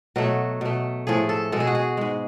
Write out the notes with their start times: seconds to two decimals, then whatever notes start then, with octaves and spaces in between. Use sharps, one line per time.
0.16 B2 F#3 A3 F#4
0.61 B2 A3
1.07 A2 F3 A3 G#4
1.29 A4
1.52 B2 G#3 A4
1.60 G#4
1.67 F#4
1.75 G#4
1.97 G#2 G#3